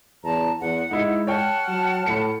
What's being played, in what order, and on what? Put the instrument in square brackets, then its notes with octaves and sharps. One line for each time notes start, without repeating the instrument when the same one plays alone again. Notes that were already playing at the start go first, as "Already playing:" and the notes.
[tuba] E2 [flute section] A5 A#5
[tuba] E2 [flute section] F#5
[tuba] G#3 [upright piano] D#4 E4
[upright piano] C#5 G5 [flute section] F#5 A5 F6
[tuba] F#3
[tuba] A2 [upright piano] B5 C#7